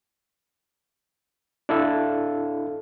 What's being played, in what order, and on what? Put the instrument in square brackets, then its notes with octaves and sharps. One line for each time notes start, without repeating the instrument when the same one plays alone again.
[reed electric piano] D4 E4 A4 F5